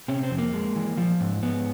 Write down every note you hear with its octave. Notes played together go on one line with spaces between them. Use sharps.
C3 C#4
C4
F2
A#3
G#3
E3
F3
G#2
G#2 B3